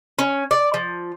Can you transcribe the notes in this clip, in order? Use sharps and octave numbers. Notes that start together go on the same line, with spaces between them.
C#4
D5
F3